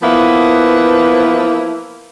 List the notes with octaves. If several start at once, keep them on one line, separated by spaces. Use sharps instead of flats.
F3 A#3 B3 E4 B4